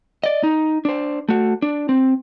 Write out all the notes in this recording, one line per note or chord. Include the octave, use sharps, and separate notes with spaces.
D5 D#5
D#4
D4 C5
A3 F#4
D4
C4